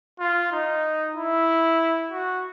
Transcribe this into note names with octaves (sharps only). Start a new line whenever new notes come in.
F4
D#4
E4
F#4